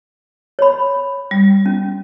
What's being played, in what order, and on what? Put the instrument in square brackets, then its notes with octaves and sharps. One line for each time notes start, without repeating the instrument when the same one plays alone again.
[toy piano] C#5 B5
[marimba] G3
[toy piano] C#4